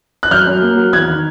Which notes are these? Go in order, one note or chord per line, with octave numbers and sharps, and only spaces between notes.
F#6
F#2 F6 G6
F#2
A#3
F#3
E2 F#6 G#6
D#3